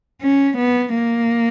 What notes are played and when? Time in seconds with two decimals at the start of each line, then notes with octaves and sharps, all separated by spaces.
0.22 C#4
0.58 B3
0.94 A#3